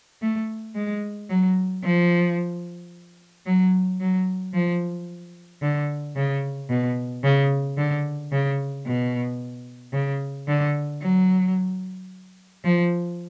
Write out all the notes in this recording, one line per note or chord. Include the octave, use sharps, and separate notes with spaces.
A3
G#3
F#3
F3
F#3
F#3
F3
D3
C#3
B2
C#3
D3
C#3
B2
C#3
D3
F#3
F3